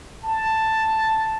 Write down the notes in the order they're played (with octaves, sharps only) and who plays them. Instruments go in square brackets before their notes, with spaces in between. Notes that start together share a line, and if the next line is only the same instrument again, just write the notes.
[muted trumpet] A5